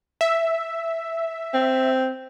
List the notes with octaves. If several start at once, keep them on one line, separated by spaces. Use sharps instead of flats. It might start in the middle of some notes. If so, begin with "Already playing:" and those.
E5
C4